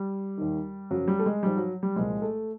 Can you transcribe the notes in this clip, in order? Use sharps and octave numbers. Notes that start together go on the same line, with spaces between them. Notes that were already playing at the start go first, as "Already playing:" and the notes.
Already playing: G3
D#2 D#3
F#2 C#3 F3 F#3
G3
A3
G#3
G#2 F3 G3
F#3
G3
C2 A#2 F3 G#3
A3